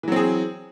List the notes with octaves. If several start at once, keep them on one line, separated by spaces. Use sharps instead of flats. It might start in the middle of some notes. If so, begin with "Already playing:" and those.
E3 F#3 C4 G#4